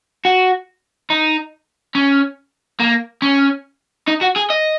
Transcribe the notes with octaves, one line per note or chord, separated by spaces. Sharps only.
F#4
D#4
C#4
A#3
C#4
D#4
F#4
G#4
D#5